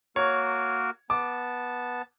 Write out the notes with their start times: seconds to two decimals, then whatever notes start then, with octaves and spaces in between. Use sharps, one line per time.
0.16 A#3 F#4 A#4 C#5
1.10 B3 A5 D6